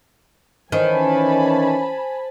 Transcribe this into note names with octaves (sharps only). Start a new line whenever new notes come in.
D#3 E3 C#4 C5 G#5 A5 B5